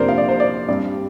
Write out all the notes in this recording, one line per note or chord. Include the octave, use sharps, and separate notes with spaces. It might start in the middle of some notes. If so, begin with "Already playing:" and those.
Already playing: F2 C3 A#3 D4 A#4 C5 D5
F5
D5
C5
D5
G2 G3 C4 D5